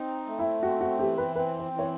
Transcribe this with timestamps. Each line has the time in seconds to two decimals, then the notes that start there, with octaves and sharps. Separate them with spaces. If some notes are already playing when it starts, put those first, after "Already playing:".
Already playing: C4 D#4
0.26 A3
0.39 E4
0.63 C4 F#4
0.81 F#4
0.99 E3 G4
1.18 B4
1.35 C4 B4
1.59 C5
1.72 E3
1.79 C#5